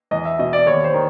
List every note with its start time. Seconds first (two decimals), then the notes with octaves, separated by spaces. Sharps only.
0.11 E2 D#5
0.25 E5
0.39 B2 D#5
0.53 D5
0.66 D#2 C#5
0.84 C5
0.94 D#3